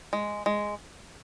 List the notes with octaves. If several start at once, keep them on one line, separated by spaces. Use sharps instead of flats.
G#3
G#3